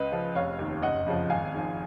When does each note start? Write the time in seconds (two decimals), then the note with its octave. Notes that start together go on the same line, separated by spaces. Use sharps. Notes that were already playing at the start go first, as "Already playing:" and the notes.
Already playing: C#2 B4 D#5
0.12 C#3 F3
0.35 F1 C#5 F5
0.59 D#2 D#3
0.82 F#1 D#5 F#5
1.06 F2 C#3 F3
1.30 G#1 F5 G#5
1.54 G#2 F3